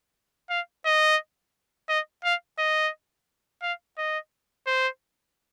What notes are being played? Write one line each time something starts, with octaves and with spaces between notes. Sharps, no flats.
F5
D#5
D#5
F5
D#5
F5
D#5
C5